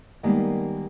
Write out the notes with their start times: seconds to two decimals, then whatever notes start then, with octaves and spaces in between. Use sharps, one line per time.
0.23 D#3 G3 G#3 A#3 B3